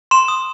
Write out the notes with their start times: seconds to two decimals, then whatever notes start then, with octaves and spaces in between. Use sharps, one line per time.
0.11 C6 E7
0.28 D#6